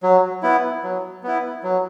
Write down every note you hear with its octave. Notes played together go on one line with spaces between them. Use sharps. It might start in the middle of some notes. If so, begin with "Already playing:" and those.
F#3
B3 E4
F#3
B3 E4
F#3